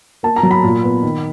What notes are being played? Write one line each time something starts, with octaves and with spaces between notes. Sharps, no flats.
A#3 A5
A#5
F#3
B5
A#2
B3
D#3